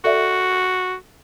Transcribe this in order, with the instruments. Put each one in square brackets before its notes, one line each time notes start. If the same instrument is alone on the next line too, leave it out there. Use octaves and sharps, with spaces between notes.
[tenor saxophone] F#4 [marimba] A4 D5 E5